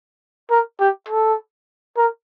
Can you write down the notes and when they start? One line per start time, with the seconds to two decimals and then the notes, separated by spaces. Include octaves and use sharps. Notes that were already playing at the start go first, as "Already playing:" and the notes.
0.50 A#4
0.80 G4
1.09 A4
1.97 A#4